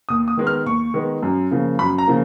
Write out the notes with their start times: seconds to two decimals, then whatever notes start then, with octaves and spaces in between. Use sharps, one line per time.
0.09 D#2 D#6
0.28 D#6
0.37 D#3 G#3 B3
0.47 F6
0.66 D#2 C#6
0.94 D#3 G#3 B3
1.22 F#2
1.51 C#3 F3 A#3
1.79 F#2 B5
1.98 A#5
2.07 C#3 F3 A#3